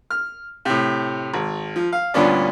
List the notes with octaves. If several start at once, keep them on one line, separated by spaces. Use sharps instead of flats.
F6
A2 C3
G#1
F3
F5
D2 G2 A#2 B3 C#4 D4